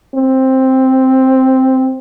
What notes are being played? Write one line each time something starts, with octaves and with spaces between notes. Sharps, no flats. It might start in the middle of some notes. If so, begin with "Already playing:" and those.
C4